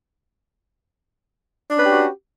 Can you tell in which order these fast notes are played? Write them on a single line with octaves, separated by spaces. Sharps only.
D4 C#4 B4 G4 F#4